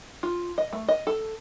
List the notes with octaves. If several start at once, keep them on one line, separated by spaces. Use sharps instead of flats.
F4
D#5
A3
D#5
A4